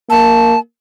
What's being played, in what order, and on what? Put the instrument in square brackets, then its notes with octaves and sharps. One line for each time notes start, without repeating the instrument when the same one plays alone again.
[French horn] A#3 [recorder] A5